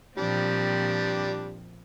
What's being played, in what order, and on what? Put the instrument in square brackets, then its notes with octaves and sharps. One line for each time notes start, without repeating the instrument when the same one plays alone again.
[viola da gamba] A#2 F3 C4 [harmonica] G3 D4